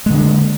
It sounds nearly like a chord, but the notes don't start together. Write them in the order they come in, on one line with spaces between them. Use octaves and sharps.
G#3 D3 A#3